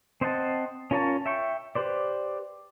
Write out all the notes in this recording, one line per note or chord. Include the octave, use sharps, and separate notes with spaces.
C4 C5 D#5 F#5 A5
C#4 F4 A#4 C#5 A5
E5 G5 C#6
G4 B4 C5 D5